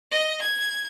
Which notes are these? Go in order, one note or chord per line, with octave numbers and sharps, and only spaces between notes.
D#5
G#6